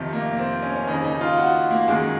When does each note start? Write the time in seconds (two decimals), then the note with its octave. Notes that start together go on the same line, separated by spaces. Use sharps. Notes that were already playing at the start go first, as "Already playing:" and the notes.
Already playing: F2 C3 D#3
0.13 A#3
0.38 C4
0.63 C#4
0.76 C#4
0.87 D#2 D#4
0.92 C#3
1.04 D#4
1.21 F4
1.38 F#4
1.71 A#3
1.88 F#2 D#3 G#3